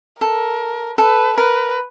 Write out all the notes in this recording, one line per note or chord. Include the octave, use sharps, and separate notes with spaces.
A4 A#4
A4 B4
A#4 B4